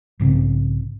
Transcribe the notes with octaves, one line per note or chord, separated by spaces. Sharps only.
B1 G#2 C#3 C4